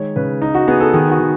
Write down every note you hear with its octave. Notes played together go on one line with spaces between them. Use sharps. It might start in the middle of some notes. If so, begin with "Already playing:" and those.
Already playing: D#3 G#3 C#5
C#3 B4
D#4
F#4
B3 G#4
A4
D#3 G#4
F#4
D#3